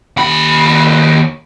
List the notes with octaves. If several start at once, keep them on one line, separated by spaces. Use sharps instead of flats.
D#2 B5